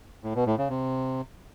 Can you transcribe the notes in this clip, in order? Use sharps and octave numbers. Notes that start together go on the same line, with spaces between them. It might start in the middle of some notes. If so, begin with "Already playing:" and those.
A2
B2
A2
C#3
C3